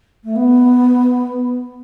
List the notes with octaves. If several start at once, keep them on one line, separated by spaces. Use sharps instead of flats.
A3
B3